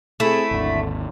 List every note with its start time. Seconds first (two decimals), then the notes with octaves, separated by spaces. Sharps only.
0.20 A3 C4 E4 G#4 A4
0.51 G#1 D#2 D3